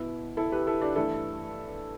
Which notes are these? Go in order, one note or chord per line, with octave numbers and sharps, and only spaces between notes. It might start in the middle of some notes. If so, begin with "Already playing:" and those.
Already playing: B2 B3 E4
E4 A4
G4 B4
E4 A4
D4 G4
G2 E3 A3 E4 A4